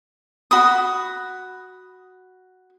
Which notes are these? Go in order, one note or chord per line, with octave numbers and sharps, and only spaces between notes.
F#4 B5 D#6